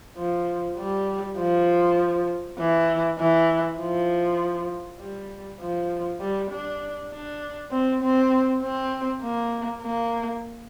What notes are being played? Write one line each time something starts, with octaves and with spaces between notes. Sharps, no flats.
F3
G3
F3
E3
E3
F3
G3
F3
G3
D4
D4
C4
C4
C4
A#3
A#3